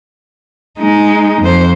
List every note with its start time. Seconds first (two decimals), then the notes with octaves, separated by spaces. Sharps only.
0.79 G#3 D#4
1.42 F2 C5